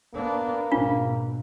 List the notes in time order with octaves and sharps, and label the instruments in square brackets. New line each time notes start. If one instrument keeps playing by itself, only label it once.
[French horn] A#3 [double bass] B3 D4
[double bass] G#1 B2 [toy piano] D4 F4
[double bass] B2